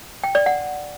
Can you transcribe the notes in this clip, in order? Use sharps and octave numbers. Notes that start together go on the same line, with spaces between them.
G5
D5
F#5